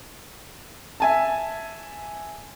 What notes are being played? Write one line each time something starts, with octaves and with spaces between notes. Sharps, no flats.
E5 G#5 A5